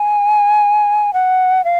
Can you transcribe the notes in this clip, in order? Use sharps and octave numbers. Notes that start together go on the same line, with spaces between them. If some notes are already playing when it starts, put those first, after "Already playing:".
Already playing: G#5
F#5
F5